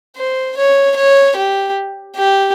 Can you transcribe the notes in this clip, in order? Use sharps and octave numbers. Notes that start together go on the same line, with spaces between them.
C5
C#5
C#5
G4
G4